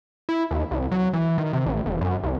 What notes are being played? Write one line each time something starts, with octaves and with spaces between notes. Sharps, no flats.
E4
D#2
C2
F#3
E3
D#3
C3
A1
E1
F#2
C2